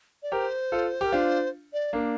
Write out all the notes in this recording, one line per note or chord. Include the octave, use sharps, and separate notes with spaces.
D5
G4 A#4 C5
F4 A4
G4 A#4
D4 F4 C5
D5
A#3 D4